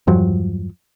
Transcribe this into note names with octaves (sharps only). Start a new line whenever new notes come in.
E2 G2 F3 F#3